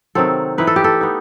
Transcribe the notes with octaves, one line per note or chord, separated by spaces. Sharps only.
C3 D#3 F#3 C4 A4
E3 A3 D#4 B4
A4
G4
A4
B3 D#4